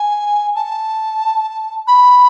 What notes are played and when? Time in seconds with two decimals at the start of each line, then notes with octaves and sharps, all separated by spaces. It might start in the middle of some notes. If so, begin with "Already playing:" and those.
Already playing: G#5
0.55 A5
1.87 B5